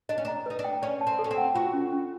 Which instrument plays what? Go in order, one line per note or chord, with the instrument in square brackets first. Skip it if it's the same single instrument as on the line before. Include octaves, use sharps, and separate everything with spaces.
[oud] D4 [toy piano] D#5
[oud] C#4
D4
[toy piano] A#5
[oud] D#4 [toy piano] B4
[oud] D4
[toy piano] G5
[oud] C#4 [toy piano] D5
[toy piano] A5
[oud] C4
[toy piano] A4
[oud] C#4
C4
[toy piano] F#5
[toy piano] F4 [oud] F#4
[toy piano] C#4
C#4